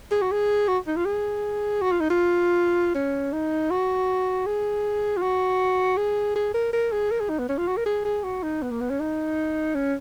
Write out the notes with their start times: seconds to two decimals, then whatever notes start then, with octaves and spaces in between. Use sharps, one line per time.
0.11 G#4
0.22 F#4
0.32 G#4
0.68 F#4
0.87 D#4
0.96 F4
1.06 G#4
1.82 F#4
1.92 F4
2.00 D#4
2.10 F4
2.95 C#4
3.33 D#4
3.71 F#4
4.46 G#4
5.17 F4
5.22 F#4
5.97 G#4
6.35 G#4
6.54 A#4
6.73 A#4
6.92 G#4
7.11 A#4
7.20 G#4
7.30 D#4
7.39 B3
7.49 C#4
7.58 F4
7.68 F#4
7.77 A#4
7.86 G#4
8.05 G#4
8.24 F#4
8.43 D#4
8.62 B3
8.71 A#3
8.81 B3
8.90 C#4
9.00 D#4
9.75 C#4